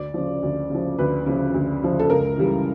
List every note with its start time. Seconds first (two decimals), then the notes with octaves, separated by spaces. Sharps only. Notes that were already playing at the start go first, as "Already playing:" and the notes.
Already playing: D2 D5
0.14 C#3 F3
0.43 D2
0.70 C#3 F3
0.99 D2 B4
1.26 C#3 F3
1.54 D2
1.82 C#3 F3
1.99 A4
2.10 C#2 A#4
2.38 C#3 E3 G3